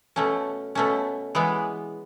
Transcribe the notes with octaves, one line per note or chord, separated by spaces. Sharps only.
B2 A3 C#4
B2 A3 C#4
E3 G#3 B3